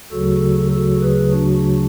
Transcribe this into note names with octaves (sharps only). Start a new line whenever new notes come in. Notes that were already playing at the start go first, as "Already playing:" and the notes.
D2 C#3 F#3 F#4 A4
F#4 A4
G#4 B4
D4 F#4